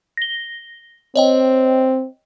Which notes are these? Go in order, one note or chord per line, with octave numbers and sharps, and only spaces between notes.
A#6 G7
C4 C#5 D#5 G5